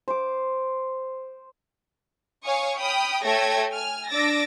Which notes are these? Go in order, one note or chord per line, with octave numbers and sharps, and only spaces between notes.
C5 D6
C#5 F5 G#5 C#6 D#6
G5 B5 D#6 F6
A3 A4 C#5 G5 G#6 A#6
G#5 F6
D4 D6 E6 A6 A#6